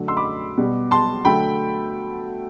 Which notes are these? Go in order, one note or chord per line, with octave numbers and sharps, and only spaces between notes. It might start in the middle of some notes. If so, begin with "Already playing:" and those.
Already playing: D3 F#3 A3
C6 E6
B5 D6
B2 G3
A5 C6
D3 F#3 A3 G5 B5